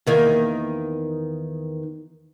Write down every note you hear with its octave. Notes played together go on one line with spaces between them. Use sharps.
E2 D#3 A#3